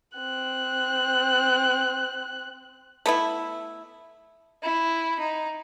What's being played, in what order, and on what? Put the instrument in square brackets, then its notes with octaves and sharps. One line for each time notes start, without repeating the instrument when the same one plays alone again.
[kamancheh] C4 F#6
[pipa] A3 B3 E4
[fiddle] E4
D#4